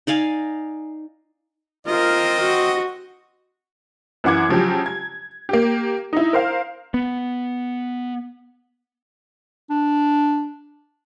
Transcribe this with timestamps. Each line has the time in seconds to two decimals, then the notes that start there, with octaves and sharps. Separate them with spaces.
0.07 D#4 D5 F5 G#5
1.87 C4 F4 A#4 D#5
2.41 F#4
4.24 F#2 E3 F#5 D6 G#6
4.49 C#3 F3 F#3 G4
4.86 G#6
5.49 A#3 G4
6.13 D#4 E4
6.33 A#4 C5 F5
6.94 B3
9.70 D4